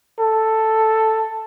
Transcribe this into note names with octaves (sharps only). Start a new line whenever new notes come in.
A4